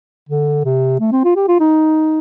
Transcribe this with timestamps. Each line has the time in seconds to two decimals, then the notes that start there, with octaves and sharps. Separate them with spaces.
0.29 D3
0.65 C3
1.00 A3
1.12 C4
1.25 F4
1.36 G4
1.48 F4
1.60 D#4